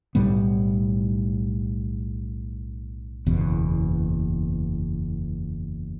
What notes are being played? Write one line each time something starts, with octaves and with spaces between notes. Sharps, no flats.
B1 A2 G3 B3
F#1 E2 B2